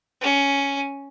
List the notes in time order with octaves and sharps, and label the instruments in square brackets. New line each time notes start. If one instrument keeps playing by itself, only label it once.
[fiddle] C#4